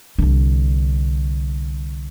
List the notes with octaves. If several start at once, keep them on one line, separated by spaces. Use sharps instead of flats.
C2 D3